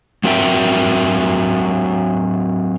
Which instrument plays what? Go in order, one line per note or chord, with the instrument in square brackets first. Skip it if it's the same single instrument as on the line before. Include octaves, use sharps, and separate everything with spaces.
[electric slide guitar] F#3 C4 F#4 A#4 E5 G5